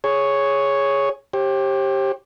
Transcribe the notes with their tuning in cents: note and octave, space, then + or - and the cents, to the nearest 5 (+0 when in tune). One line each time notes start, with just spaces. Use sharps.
G#4 +0 C#5 +0
G4 +0 C5 +45